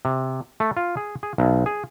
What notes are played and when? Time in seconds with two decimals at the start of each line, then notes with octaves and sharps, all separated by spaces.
0.05 C3
0.60 A3
0.77 F4
0.97 G#4
1.23 G#4
1.38 B1
1.66 G#4